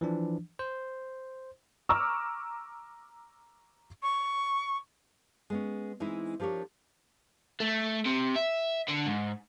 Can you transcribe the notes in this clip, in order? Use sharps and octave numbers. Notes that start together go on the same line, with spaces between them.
E3 F3 D4
C5
A#5 C#6 D6 E6 F6
C#6
G#3 B3 C#4
E3 G#3 C4 D#4 E4
F3 D4 G4 A#4 C#5
A3
C3
E5
D3
G#2